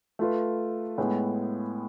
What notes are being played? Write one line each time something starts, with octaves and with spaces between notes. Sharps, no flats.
A3 F4 B4
A2 G#3 B3